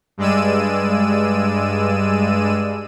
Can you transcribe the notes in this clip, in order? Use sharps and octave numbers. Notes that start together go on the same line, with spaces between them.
G2 G#3 D5 E6 D#7